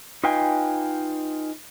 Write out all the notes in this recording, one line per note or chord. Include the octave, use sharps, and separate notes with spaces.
D#4 F4 B4 F5 G5 G#5